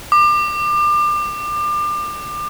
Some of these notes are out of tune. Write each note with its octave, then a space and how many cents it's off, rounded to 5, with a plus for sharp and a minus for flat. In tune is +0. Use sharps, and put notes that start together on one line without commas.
D6 +30